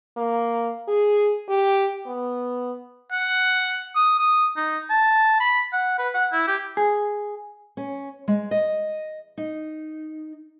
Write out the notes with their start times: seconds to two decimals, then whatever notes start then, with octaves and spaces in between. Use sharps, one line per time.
0.17 A#3
0.88 G#4
1.49 G4
2.06 B3
3.12 F#5
3.96 D#6
4.19 D#6
4.57 D#4
4.90 A5
5.40 B5
5.73 F#5
5.99 B4
6.15 F#5
6.33 E4
6.48 G4
6.77 G#4
7.77 C#4
8.28 G#3
8.51 D#5
9.38 D#4